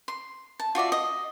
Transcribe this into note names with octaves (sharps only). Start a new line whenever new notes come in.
C6
A5
F4 F#4 D5 E5
D#5